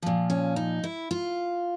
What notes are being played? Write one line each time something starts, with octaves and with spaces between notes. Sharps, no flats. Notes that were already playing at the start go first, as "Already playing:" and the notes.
A#2 F3
C#4
D#4
E4
F4